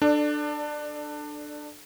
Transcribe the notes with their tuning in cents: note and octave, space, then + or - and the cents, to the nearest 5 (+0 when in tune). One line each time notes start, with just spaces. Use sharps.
D4 +20 A4 +0 D5 +0